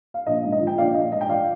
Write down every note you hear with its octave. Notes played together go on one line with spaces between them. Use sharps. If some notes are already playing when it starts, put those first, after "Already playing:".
F5
A#1 D#5
G#2
D#5
F3
G5
A#1 D5 F5
A#1 D#5
G#2 D#5
G5
F3 D5 F5